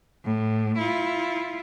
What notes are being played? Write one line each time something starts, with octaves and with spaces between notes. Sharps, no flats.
A2
E4 F4